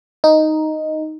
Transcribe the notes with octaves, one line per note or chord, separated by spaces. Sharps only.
D#4